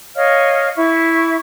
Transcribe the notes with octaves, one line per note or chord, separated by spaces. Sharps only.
C#5 D#5 F5 F6
E4 E5 C#6